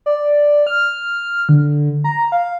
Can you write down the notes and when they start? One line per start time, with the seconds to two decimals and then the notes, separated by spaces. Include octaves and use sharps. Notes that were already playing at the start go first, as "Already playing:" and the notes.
0.06 D5
0.67 F6
1.49 D3
2.04 A#5
2.32 F5